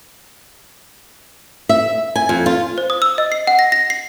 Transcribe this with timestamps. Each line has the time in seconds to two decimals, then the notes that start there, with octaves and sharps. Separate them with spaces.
1.69 E5
2.16 G#5
2.29 F2
2.46 F4
2.78 C5
2.90 D#6
3.02 E6
3.18 D#5
3.32 C7
3.47 F#5
3.59 A#6
3.72 A#6
3.90 C7